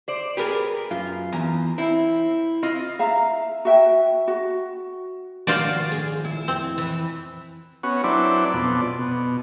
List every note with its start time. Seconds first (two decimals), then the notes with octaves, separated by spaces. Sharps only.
0.08 C5 D5
0.37 G4 G#4 A#4 B4
0.91 F#2 F4
1.32 E2 G#5 A#5
1.78 C4 E4
2.63 C4 F4 D#5
2.99 E5 F5 A#5
3.65 F#4 E5 G5
4.28 F#4
5.47 G#1 D#3 F3 F4 F#4 C5 D5 F5
5.92 G#4
6.25 E4
6.48 F2 C4
6.78 E3
7.83 B3 C#4 F#4
8.04 F#3 C4 D4 E4 B4 D5
8.54 F2 B2 D5
8.99 B2